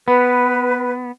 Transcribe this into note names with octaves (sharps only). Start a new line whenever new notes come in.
B3 B4